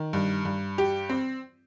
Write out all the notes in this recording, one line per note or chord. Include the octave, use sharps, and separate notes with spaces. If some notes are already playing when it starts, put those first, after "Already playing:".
Already playing: D#3
G2
G2
G4
C4